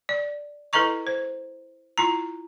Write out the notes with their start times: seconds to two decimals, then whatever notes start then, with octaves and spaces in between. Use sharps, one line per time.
0.09 D5
0.73 E4 A4 B4 D#5 A#5 C#6
1.07 C5
1.98 E4 F4 A#5